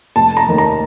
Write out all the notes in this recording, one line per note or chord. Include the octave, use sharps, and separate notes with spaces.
F1 A5
A#5
D#2 D#3 A3
A#5